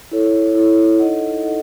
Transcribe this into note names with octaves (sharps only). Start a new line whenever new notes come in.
E4 A4 C#5
E4 A4 C#5
D#4 A4 D#5 F#5
D#4 A4 D#5 F#5